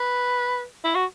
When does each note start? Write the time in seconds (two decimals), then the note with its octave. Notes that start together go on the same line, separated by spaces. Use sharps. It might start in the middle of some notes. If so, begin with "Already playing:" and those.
Already playing: B4
0.84 E4
0.95 F#4